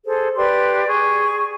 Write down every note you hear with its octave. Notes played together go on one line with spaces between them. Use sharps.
G#4 A4 C5
G4 B4 D5 C6
G#4 C#6